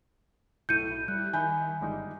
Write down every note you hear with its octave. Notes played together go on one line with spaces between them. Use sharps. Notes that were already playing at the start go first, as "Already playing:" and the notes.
B1 A2 A3 G6 C#7 D#7
E4
G3 F#6
D#3 E5 G#5 B5 G6
G1 G3 G#3 D#4